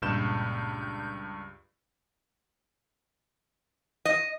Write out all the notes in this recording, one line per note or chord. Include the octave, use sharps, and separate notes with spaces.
C#2 G2 A#2 G6 E7
D#5